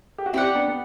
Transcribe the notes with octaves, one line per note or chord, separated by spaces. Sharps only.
G4
F#4
C4 E4 G4 D5 F#5
B3 D4
B3